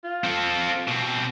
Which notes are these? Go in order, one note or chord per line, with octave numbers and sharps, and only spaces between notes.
F4
C4 A4
B2 C4